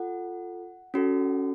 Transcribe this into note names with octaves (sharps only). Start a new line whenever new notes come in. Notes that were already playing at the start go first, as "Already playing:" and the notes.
Already playing: F4 A4 F#5
C#4 F#4 A4